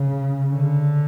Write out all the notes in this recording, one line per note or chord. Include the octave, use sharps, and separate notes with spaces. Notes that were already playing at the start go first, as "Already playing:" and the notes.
Already playing: C#3
D3